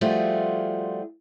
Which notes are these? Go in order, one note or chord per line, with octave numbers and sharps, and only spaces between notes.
F3 G3 A3 F4 F#4 G#4